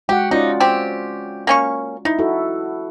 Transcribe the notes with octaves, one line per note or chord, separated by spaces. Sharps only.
G#3 F#4 G4 F#5
C#4 D#4 F4 D5
C4 G4
A#3 C#4 C#6
D#4 E4
E4 F#4 A4